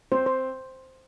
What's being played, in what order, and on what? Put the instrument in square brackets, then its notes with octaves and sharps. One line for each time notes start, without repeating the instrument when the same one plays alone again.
[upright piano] C4 [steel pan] C5
[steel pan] C5